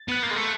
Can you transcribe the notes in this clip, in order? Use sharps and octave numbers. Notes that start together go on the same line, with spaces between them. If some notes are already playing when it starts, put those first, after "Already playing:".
Already playing: A6
B3 F#6
A#3 G6
G#3
A3